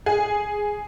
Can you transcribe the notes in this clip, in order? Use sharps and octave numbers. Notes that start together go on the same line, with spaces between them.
G#4